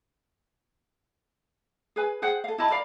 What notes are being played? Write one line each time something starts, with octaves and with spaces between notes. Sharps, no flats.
G#4 B4 G#5
G#4 C5 F#5 G5
A4 F5
E4 D#5 A5 B5
A#4 D5 F5 B5